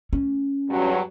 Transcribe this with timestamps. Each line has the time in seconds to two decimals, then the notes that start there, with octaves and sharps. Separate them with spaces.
0.13 C#4
0.71 E2 G2 F#3